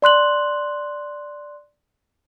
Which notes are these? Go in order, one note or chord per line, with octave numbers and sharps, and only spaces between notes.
D5 C6 F#6 F#7